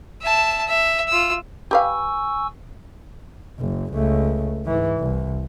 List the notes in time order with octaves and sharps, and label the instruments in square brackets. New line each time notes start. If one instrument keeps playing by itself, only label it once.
[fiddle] E5 A5
E5
F4 E6
[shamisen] G4 B4 F5 [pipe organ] G#5 C#6 E6
[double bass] F#1
C#2 A3
G#2 E3
C2